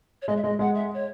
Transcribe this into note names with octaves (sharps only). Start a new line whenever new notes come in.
C#5
G#3 D#5
E5
G#3 D#5
G#3 F#5
E5
C#5